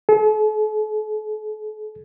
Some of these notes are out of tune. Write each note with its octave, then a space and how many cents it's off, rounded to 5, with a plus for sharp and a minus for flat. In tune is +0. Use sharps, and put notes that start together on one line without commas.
A4 -45